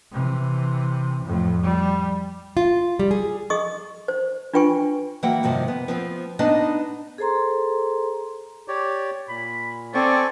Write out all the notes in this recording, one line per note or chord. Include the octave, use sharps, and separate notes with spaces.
C3 E3
F2 A2
G3
F4
G3
G#4
G#4 D#5 C#6 D#6
C5
D4 F4 B4 G5 G#5 C#6
E3 F#3 A#3 F#5 G5
G2 C3 D#3 F3
B3
F3 B3 C4
B3 D4 D#4 B4 D#5 A5
G#4 A4 C5 A#5 C6
G4 C#5 D5
A#2 B5
C4 A4 D5 G#5 C#6